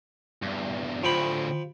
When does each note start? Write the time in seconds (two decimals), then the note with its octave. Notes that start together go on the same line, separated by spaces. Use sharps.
0.42 E2 G2
1.04 D2 A2 F3 G5 B5